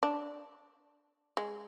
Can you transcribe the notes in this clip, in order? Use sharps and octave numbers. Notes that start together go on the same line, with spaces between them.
D4
G#3